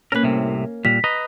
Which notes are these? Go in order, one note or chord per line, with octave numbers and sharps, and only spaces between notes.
A#3 C#4 A#4 B4
C2 A2 C3
A#2 G3 B6
B4 D#5 A#5